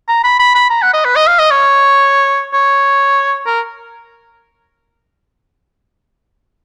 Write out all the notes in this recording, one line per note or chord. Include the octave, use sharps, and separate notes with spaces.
A#5
B5
B5
B5
A#5
F#5
D#5
B4
D#5
F5
D#5
C#5
C#5
A#4